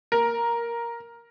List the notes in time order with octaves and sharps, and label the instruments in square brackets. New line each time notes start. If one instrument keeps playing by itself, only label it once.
[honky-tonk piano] A#4